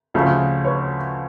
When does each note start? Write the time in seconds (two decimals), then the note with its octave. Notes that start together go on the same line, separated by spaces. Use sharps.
0.14 D2 C#3 F3 A3
0.65 B4 C#5